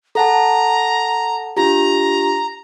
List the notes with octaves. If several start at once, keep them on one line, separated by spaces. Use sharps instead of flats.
A4 F#5 A5 A#5
D4 F4 G4 A#5